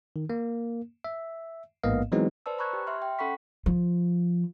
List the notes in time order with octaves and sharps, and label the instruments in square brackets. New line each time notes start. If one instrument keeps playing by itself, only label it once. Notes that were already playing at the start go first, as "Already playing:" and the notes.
[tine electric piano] D#3
A#3
E5
A1 G#2 A#3 B3 D#5 F5
E3 F#3 G#3 B3 C4 D#4
[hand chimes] B4 C5 D5 A5 E6
A#5 B5 C#6 F#6 G#6
G4
E5 C6 F6
G5
C#4 A4 F#5 B5 C#6 B6
[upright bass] F3